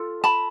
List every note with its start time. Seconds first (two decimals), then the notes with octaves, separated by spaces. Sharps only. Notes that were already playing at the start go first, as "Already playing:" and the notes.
Already playing: F4 A4
0.24 A5 B5